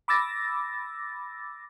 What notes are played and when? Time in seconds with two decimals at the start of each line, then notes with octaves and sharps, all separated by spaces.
0.08 B5 D6 E6 A6 A#6